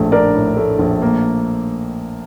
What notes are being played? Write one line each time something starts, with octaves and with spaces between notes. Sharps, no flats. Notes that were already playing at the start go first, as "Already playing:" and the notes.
Already playing: A#1 A2 A3
D4 A#4 D5
A2
A3
A#1
A#3